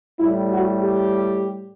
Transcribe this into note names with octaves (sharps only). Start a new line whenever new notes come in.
A2 G3 E4
F#4
G4